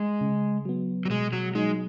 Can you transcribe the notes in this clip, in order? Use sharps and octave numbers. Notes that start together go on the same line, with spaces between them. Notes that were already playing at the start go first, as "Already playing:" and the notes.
Already playing: G#3
C#3
F#3 B3
F#3
B2 G#3
F#3
F#3 G#3 D#4